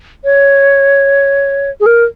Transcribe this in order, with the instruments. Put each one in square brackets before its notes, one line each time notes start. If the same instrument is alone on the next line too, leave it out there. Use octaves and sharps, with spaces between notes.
[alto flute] C#5
G#4
A#4